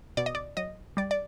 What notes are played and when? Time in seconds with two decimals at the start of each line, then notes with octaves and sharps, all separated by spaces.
0.17 B2 D5
0.26 D#5
0.35 D5
0.57 F#3 D#5
0.97 G3 D5
1.11 D5